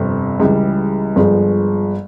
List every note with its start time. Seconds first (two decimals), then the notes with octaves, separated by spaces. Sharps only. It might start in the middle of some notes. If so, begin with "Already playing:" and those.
Already playing: G1 F2 C3
0.40 C#2 C#3 E3 G3
1.16 G1 G2 F3 G#3